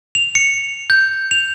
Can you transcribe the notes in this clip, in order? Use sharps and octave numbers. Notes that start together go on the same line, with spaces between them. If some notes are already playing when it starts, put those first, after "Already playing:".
F7
C#7
G6
F7